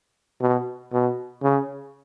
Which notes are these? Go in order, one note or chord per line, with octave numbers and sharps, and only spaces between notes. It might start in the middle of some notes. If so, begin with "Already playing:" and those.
B2
B2
C#3